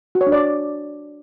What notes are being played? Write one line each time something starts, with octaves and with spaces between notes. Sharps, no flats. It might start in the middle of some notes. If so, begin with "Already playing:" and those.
F#4
C#5
D4
D5